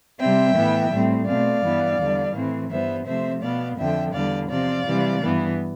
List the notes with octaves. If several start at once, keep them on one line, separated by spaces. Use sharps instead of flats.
C3 G3 C4 E5 G5
A2 E3 B3
A2 G3 C4
B2 A3 C4 D5 F5
G2 E3 B3
E2 D3 G3
A2 E3 A3 C4
G2 E3 G3 B3 C5 E5
C3 F3 A3 C4 C5 E5
B2 B3 D5 F5
F2 D3 F3 E5 G5
E2 D3 G3 D5 F5
C3 F3 C4 D5 F5
C3 E3 G3
G2 E3 B3